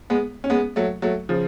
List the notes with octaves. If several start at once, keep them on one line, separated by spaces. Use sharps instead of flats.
G#3 B3
C#4
G#3 B3
F#3 A3
F#3 A3
C#3 F3